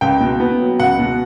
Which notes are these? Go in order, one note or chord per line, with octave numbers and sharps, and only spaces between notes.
C#2 G5
B2
B3
F#3
C#2 F#5
B2